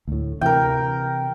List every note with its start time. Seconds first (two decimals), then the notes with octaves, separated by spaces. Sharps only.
0.08 D2 A2
0.41 C3 E3 A#4 G5